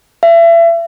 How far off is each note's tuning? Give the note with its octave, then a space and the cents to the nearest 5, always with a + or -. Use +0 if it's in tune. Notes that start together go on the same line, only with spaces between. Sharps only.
E5 +35